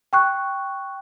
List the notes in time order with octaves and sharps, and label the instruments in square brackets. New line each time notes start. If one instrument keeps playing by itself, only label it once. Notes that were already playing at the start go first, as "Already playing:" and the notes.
[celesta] G5 C#6 F#6